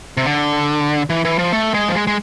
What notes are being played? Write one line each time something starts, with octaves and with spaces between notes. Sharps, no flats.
C3
D3
E3
E3
F3
A3
G#3
F3
G#3
G#3